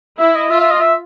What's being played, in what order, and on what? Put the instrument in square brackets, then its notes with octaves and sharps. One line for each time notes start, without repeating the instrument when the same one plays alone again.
[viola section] E4 [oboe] E5
[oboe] D#5
[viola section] F4 [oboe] E5
[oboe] E5
D#5
E5